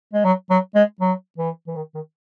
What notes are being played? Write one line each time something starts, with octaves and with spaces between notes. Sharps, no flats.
G#3
F#3
F#3
G#3
F#3
E3
E3
D#3
D#3